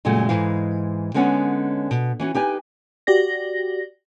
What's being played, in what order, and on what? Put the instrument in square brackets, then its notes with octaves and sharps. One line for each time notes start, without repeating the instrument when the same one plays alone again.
[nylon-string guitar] F#2 A#2 C#3 F#3 G#3 A3
G#2 E3 G#3 E4 F5
D3 G#3 B3 C#4 C#5 F#5
B2
E3 C#4 F#4
D#4 G4 B4 G#5
[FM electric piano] F#4 G4 D5 A#6